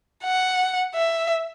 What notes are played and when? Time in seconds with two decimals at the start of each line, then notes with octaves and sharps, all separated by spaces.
0.24 F#5
0.95 E5